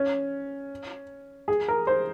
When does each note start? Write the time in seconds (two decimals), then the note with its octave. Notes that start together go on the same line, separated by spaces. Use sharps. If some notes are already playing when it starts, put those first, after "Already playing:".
Already playing: C#4
1.48 G#4
1.68 A#4
1.87 C5